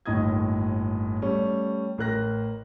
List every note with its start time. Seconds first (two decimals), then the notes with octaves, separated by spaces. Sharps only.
0.06 G1 D#2 A2 D#5 D#6 G#6
1.22 G3 A3 C#4
1.98 A1 A#4 F#6 A#6